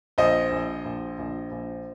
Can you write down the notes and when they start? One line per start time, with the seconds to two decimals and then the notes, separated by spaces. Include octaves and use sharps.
0.18 A#1 C5 D#5
0.52 A#1
0.85 A#1
1.19 A#1
1.52 A#1